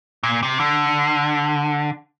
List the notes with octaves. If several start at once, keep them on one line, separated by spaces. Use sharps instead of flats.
A#2
C3
D3